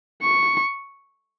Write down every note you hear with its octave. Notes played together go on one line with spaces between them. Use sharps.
C#6